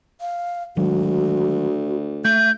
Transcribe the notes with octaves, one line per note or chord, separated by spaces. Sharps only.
F5
D2 D#3 F#3 G#3 F#4
A3 E5 G6